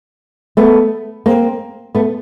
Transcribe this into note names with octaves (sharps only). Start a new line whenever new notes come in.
A3 B3
A#3 C4
A3 B3